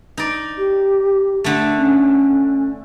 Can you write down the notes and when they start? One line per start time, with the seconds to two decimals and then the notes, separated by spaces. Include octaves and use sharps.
0.17 D#4 D5
0.58 G4
1.44 D3 A3
1.78 C#4